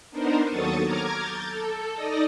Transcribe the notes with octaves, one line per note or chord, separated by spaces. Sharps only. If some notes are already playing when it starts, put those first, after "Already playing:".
B3 D4 D#4 A#4 C5
D#2 F#3 A4 C#6 D#6 A6
A#5 D6 F6 G#6
G6 A6
A4
D#4 D5 D#5 A#6